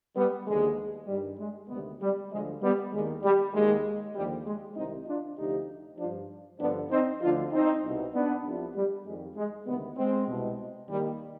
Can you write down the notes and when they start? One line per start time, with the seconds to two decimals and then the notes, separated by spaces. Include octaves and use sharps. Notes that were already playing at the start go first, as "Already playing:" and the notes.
0.16 G3 B3
0.47 D#2 D3 F3 G#3
1.08 G2 D#3 G3
1.39 G#3
1.69 D2 C3 D#3 G3 B3
2.01 G3
2.31 D2 D3 F3 G#3
2.61 G3 B3
2.92 D#2 D#3 G#3
3.23 G3
3.53 D#2 D#3 G#3
4.14 D#2 D3 F3 G3
4.45 G#3
4.76 C2 C3 D#3 C4 D#4
5.07 D4 F4
5.37 D2 C3 F3 D#4 G4
5.98 G2 F3 D4 F4
6.60 G2 D3 F3 B3 D4
6.91 C4 D#4
7.21 D2 D3 F3 D4 F4
7.52 C4 D#4
7.83 C2 B2
8.14 B3 D4
8.44 C2 C3 F3
8.75 G3
9.05 F2 D#3 G#3
9.36 G#3
9.66 D2 C3 D#3 G3 B3
9.97 G#3 C4
10.28 C2 B2
10.89 D#2 D#3 G3